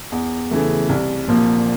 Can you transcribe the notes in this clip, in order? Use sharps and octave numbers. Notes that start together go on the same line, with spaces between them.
E2
C#3 E3 A3
C2
A#2 F3 A#3